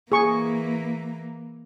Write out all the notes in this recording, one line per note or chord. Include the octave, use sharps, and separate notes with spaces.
E3 A#3 G#4 C#6